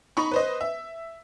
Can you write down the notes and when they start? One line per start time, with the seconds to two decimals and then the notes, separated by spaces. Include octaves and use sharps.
0.17 D#4 B5 C#6
0.31 B4 C5 D#5
0.61 E5